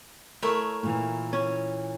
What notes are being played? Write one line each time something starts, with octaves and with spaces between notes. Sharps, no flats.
A3 E4 A#4 C#5
A#2 E3
C#4